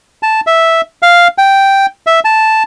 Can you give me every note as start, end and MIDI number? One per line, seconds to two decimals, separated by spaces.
0.23 0.41 81
0.47 0.81 76
1.02 1.28 77
1.38 1.86 79
2.07 2.20 76
2.25 2.63 81